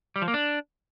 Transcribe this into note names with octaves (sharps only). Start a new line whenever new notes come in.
G3
F3
A#3
D4